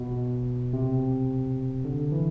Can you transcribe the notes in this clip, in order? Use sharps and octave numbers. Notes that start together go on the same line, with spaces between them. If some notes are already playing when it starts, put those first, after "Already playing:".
Already playing: B2
C3
D3
E3